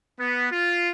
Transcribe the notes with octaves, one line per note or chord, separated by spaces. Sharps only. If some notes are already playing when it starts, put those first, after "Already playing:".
B3
F4